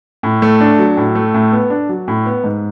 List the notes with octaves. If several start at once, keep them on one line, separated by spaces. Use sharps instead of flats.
A2
A3
D4
F#3
A2
A3
A2
B3
D4
F#3
A2
B3
G#2